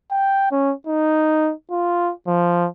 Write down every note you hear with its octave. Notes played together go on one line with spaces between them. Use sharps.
G5
C#4
D#4
F4
F3